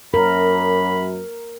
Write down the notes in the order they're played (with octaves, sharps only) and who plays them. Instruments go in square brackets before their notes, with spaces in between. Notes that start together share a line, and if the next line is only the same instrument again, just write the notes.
[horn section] F#2 [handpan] A#4 [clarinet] B5